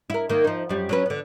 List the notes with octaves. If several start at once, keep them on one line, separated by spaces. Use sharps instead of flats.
E4 A#4
D#3 A#3
F3 D#4
F#2 G3
F#3 C#4 B4
D3 B3